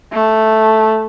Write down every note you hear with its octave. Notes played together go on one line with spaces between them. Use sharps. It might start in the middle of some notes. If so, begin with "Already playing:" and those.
A3